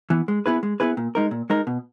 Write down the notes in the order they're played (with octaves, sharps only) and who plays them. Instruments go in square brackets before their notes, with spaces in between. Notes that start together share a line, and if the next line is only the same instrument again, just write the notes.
[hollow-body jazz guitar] E3 B3
G#3
B3 E4 G#4 B4
G#3
B3 E4 G#4 B4
A#2
G#3 D#4 A#4
A#2
G#3 D#4 A#4
B2